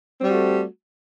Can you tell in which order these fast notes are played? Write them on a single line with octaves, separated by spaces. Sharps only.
C4 G3 F#4 A3